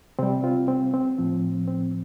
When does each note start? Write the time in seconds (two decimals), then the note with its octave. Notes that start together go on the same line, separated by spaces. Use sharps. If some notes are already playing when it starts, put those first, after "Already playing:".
0.19 C3 G3 C4
0.44 C4 F4
0.68 C4
0.94 C4
1.18 A2 F3 C4
1.67 C4